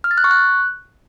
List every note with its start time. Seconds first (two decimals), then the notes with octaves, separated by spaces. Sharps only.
0.04 F6
0.11 A6
0.18 F#6
0.24 C#6
0.31 F#6